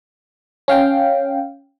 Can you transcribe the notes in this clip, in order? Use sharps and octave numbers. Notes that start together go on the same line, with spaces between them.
C#4 F5 G5